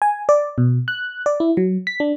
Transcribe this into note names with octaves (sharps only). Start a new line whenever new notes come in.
G#5
D5
B2
F#6
D5
E4
F#3
B6
D4